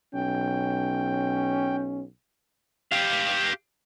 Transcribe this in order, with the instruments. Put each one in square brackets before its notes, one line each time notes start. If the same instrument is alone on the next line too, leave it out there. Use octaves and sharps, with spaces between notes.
[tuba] B1 [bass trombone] C#4 [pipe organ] G5
[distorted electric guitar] G4 F5